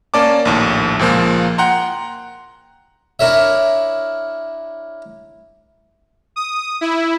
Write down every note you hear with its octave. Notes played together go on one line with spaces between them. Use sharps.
A#3 C#4 D5 A5 D6
A#1 D#2 A2
C#2 A#2 F3 A#3
F#5 G5 A#5 C6
D4 E4 A#4 C#5 E5
D#6
E4